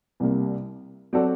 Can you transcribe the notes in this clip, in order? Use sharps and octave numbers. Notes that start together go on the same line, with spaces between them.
C2 C3 G3 A#3
F#3 C4 F#4 A4 D5